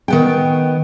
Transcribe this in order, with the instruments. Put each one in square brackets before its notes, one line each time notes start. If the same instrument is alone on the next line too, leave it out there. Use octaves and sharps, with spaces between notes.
[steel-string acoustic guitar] D#3 B3 G5